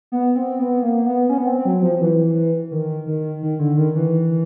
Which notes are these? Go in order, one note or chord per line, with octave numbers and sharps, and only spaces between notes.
B3
C4
B3
A#3
B3
C#4
B3
C4
F#3
F3
E3
D#3
D#3
D#3
D3
D#3
E3